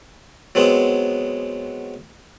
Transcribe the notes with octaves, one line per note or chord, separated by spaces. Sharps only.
F#3 G#3 B3 C4